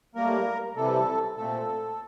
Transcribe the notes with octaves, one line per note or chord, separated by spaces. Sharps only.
A2 G3 A#3 A#4
C3 E3 G3 A4
A#2 A3 C4 A4